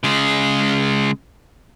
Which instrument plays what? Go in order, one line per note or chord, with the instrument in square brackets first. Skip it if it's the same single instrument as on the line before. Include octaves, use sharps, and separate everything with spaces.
[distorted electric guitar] C#3 G#3